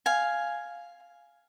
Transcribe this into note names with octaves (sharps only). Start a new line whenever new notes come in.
F5 G#5